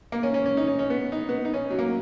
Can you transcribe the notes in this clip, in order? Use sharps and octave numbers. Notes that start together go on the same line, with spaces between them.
A#3
C#4
C#4
C#4
D#4
C#4
C#4
B3
D#4
B3
D#4
C#4
F#3
A#3